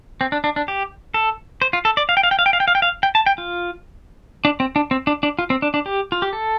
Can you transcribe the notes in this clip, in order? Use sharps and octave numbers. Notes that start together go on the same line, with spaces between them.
C4
D4
D4
D4
G4
A4
C5
F4
A4
D5
F5
G5
F5
G5
F5
G5
F5
G5
F5
G5
F5
G5
A5
G5
F4
D4
C4
D4
C4
D4
D4
F4
C4
D4
D4
G4
F4
G4
A4